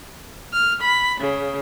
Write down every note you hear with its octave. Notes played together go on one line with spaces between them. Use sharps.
F6
B5
C#3